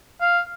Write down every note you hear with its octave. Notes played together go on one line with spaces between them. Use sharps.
F5